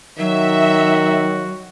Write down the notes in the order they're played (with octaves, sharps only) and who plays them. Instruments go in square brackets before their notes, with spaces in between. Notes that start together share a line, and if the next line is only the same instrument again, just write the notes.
[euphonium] D#3 [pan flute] F#3 [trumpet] F#4 [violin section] E5